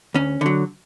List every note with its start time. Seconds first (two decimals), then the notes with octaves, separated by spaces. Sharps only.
0.14 D2 C#4
0.41 D3 F#3